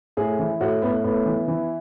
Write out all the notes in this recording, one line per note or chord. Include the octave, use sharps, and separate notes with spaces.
A2 G#4
E3
A2 F#4
A2 B3
A2 B3
E3
E3